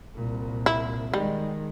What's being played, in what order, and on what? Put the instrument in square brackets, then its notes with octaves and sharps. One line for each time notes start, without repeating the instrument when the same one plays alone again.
[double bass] C2 A#2
[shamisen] E4
[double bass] D#3 G#3 [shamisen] G3